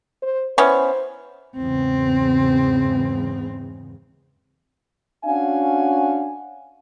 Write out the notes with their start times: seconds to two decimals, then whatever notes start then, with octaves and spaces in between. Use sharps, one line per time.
0.22 C5
0.58 E3 B3 C#4 C5
1.58 E2 G#2 C#3 C4
5.25 C#4 D4 F#4 F5 F#5 G#5